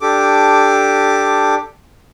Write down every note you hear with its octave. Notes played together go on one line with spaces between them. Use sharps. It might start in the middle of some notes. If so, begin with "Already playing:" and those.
D4 G4 A4 D6